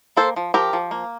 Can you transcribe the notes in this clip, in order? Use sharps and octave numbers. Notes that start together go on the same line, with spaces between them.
A#3 A4 C5
F3
F3 G4 A#4
F3
A#3